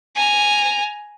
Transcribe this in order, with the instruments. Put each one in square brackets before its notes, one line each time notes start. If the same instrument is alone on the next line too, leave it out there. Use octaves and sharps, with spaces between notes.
[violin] G#5 A#5